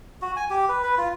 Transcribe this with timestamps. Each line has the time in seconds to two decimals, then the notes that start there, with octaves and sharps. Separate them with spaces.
0.22 F#4
0.36 G#5
0.50 G4
0.69 B4
0.83 B4
0.98 F4